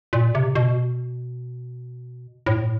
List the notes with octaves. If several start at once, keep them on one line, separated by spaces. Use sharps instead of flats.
A#2
C3
B2
A2